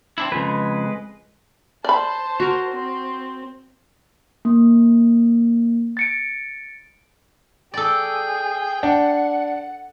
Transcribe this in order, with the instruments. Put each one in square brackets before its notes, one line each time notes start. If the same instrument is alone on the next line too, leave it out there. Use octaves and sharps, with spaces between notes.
[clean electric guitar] C4 D4 E4
[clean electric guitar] F2 C#3 [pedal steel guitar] G#3 B4
[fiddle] C5 A5 [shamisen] D5 B5
[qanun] F#4 A#4
[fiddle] C4
[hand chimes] A#3
A6 C#7 D7
[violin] G#4 [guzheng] A4 D5 [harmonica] G5
[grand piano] D4 [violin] F#5